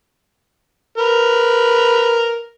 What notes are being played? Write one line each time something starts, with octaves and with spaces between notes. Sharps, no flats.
A#4 B4